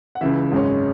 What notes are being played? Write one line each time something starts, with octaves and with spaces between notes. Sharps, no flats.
F#5
C#2 C#3 E3 E5
G#1 F#2 C#3 G#3 C#4